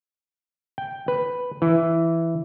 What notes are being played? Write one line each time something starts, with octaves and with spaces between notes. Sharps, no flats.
G5
B4
E3